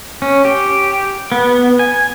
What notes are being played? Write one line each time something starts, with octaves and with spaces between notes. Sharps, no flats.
C#4
G4
B3
G#5